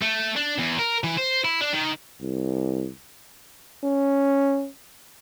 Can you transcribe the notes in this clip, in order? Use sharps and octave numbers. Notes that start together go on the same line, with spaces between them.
A3
D4
E2
A#4
E3
C5
E4
D4
D#3
C2
C#4